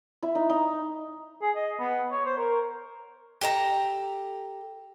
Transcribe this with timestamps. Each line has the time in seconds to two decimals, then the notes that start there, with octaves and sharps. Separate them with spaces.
0.23 E4
0.35 D#4
0.50 D#4
1.41 G#4
1.55 D#5
1.79 B3
2.11 C#5
2.25 C5
2.37 A#4
3.41 G4 A4 D5 A#5